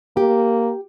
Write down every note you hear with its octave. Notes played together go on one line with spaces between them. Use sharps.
A#3 G4